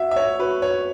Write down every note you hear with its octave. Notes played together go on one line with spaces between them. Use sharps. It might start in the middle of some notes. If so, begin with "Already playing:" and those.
Already playing: F#4 E5 F#5
E5
C#5
F#4 B4
C#5